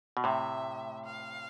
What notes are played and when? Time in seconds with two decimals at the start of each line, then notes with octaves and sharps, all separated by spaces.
0.17 B2
0.24 A2 C3 E5
1.06 F5